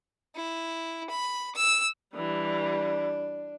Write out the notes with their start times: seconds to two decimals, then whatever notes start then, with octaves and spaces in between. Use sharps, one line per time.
0.36 E4
1.10 B5
1.56 E6
2.15 E3 G3 D4